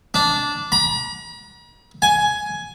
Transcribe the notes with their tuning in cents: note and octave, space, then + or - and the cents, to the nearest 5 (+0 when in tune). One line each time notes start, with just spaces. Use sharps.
D4 -10
A#5 +45
G#5 +10